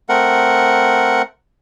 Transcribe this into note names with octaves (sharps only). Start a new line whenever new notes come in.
A3 C4 A#4 F#5